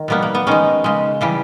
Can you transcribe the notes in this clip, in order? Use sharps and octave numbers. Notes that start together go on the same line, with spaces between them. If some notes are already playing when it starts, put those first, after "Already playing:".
Already playing: D#3
B2 G3 A#3 B3
A#3
B3
D#3 G#3 C#4
C#3 G#3
C#3 E3 G3